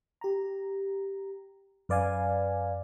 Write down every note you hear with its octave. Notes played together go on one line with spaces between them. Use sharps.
G4 A#5
F#2 B4 D5 F5 G#5